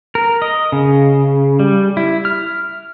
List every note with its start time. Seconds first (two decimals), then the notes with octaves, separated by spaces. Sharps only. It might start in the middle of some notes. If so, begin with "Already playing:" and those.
0.15 A#4
0.42 D#5
0.72 C#3
1.59 G3
1.97 E4
2.25 F6